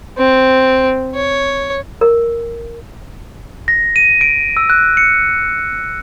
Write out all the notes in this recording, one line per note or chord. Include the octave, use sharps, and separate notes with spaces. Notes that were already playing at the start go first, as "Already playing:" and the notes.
C4
C#5
A#4
A#6
D#7
D7
E6
F#6
C#7